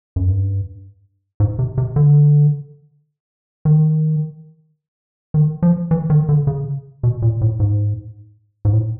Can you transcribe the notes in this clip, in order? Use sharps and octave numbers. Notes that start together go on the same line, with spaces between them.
F#2
G2
G#2
C3
C3
D3
D#3
D#3
F3
E3
D#3
D3
C#3
B2
A#2
A2
G#2
G#2
A2